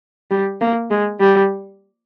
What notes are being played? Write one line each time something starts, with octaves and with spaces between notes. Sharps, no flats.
G3
A#3
G#3
G3